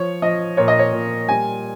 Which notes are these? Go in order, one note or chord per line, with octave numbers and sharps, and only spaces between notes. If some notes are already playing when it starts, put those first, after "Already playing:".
Already playing: F3 C#5
F3 D#5
A#2 C#5
D#5
C#5
A#2
G3 G#5